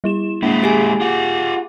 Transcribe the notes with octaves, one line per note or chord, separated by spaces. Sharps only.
G3 E4 E7
G#3 A#3 E4
G4 G#4 G#5
F4 F#5 D6